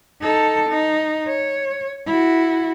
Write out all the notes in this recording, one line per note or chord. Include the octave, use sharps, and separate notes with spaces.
D#4 A4
D#4
C#5
E4 F#4